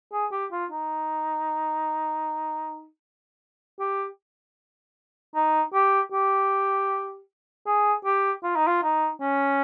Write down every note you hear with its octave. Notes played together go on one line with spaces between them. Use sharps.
G#4
G4
F4
D#4
G4
D#4
G4
G4
G#4
G4
F4
D#4
F4
D#4
C#4